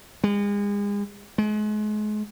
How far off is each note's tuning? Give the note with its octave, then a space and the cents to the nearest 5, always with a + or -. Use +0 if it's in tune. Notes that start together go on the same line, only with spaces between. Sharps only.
G#3 -35
G#3 +35